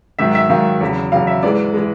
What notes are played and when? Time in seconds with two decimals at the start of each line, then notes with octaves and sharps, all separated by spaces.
0.19 G#2 D#3 F#3 E5
0.35 E5
0.50 G#2 D#3 F#3 F5
0.81 E2 C#3 F#3
1.12 E2 C#3 F#3 F5
1.27 E5
1.43 G#2 E3 G#3 D5
1.74 E3 G#3